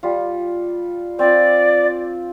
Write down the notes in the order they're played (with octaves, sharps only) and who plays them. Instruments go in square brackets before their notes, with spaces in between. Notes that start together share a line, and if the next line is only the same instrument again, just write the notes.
[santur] G3 F4
[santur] C4 F4 [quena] D5